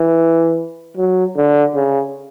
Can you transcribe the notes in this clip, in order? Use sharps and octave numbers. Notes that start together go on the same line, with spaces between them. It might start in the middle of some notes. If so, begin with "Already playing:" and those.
Already playing: E3
F#3
D3
C#3